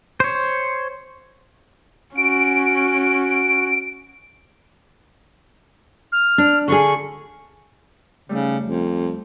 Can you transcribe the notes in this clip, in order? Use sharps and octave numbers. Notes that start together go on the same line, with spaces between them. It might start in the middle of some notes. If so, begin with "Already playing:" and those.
C5 C#5
C#4 F#4 D7
F6
D4
D3 D4 G#4 C#6
C#3 G3 A3 D#4
F2